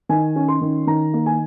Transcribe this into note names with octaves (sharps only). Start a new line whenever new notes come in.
D#3 G#5
C#4
C6
D#3
D#3 A#5
A#3
G#5